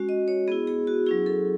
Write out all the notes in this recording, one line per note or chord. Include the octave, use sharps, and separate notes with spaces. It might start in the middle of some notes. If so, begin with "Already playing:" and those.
Already playing: G#3 C#4 F#4
D#5
C#5
B3 E4 G#4
G#4
F#4
F#3 C#4 E4 G#4
A4